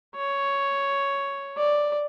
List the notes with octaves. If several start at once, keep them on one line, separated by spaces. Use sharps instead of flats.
C#5
D5